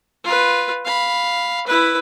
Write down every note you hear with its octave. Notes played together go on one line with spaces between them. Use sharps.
F4 B4
F5 B5
E4 B4